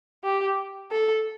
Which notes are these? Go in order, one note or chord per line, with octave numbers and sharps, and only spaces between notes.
G4
A4